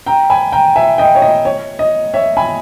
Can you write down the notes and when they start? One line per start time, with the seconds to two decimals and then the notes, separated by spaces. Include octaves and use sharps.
0.06 G5 A#5
0.30 G#5 B5
0.52 G5 A#5
0.76 E5 G#5
0.98 D#5 G5
1.15 C#5
1.22 D#5
1.45 C#5
1.79 D#5
2.14 C#5 E5
2.37 G#5 B5